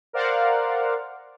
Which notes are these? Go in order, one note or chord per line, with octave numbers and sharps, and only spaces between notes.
A#4 C5 D5 F5 F#5